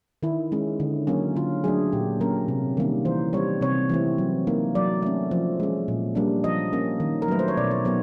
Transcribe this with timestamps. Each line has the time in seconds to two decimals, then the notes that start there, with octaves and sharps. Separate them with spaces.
0.23 D#3 E4
0.52 G#3 C#4
0.80 D3
1.07 F#3 A#3 C#4
1.36 D3 F4
1.64 F#3 A3 D4 G#4
1.93 A#2 G4
2.20 F#3 A#3 C#4 A#4
2.48 C3
2.77 D#3 G3 A#3 C#4
3.05 E3 C5
3.33 G3 C4 C#5
3.61 C3 C#5
3.89 E3 A3 C4
4.18 F#3
4.47 A#3 D#4
4.75 F#3 D5
5.02 A3 C#4
5.31 F3
5.60 G#3 C#4
5.88 A#2
6.15 G3 A#3 D4
6.44 F3 D#5
6.73 A#3 C#4
7.00 D#3
7.22 A#4
7.28 F#3 A3 B4
7.39 C5
7.48 C#5
7.57 B2 D5
7.71 C#5
7.85 F#3 B3 D#4 C#5